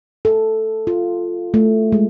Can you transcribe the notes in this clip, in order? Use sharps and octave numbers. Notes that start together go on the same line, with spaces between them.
A4
F4
A3
G#3